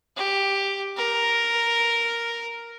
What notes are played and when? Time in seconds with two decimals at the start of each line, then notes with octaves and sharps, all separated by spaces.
0.17 G4
0.97 A#4